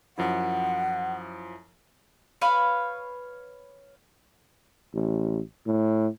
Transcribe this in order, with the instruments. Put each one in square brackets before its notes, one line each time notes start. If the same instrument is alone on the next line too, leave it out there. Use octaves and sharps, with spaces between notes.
[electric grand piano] F#2 F3 E4 [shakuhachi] F#5
[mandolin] B4 C#5 F5 B5
[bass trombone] A1
A2